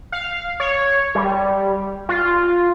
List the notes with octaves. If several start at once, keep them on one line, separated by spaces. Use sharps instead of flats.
F5
C#5
G3
F4